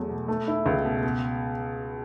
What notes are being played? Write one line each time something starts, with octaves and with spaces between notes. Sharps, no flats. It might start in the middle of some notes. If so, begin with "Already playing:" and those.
Already playing: E2 F#3 A3
B2
A3
E4
C#2
B2
B2